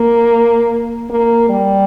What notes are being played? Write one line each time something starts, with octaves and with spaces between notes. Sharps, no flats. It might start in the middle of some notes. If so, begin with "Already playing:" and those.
Already playing: A#3
A#3
G3